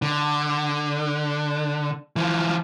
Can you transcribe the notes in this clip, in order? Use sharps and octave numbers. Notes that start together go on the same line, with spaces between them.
D3
E3 F3